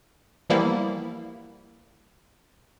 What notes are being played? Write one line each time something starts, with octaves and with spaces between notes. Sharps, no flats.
E3 F3 G3 A#3 B3 E4